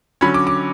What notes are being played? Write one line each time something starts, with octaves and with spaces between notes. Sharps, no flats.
D3 F#3 C#4 B5
D6
D6